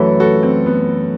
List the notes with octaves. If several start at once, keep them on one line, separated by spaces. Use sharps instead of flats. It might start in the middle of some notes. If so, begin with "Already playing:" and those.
Already playing: F#2 E3 A3 E4 F#4 A4
F#4 A4
C4
B3